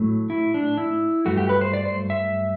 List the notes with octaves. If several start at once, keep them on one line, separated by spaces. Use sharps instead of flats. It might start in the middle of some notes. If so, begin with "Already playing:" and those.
Already playing: A2 F#3 A3
E4
D4
E4
G2 F#3 A3 F#4
G4
B4
C5
D5
C5
E5